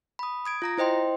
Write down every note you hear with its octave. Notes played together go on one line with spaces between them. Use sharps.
B5 D#6
D#6 G#6 D7
F4 A#5 A#6
E4 C5 D#5 G5 C6